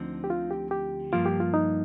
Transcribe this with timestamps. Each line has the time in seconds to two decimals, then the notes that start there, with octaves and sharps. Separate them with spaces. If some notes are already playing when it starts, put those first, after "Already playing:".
Already playing: D2 D3 F3 C4 D#4
0.24 G4
0.30 F4
0.51 G4
0.71 G4
1.13 G2 F3 A#3 F4
1.26 G4
1.40 F4
1.54 D#4